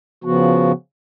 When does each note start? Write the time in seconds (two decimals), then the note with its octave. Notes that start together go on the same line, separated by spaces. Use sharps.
0.24 C#3 F3 B3 F#4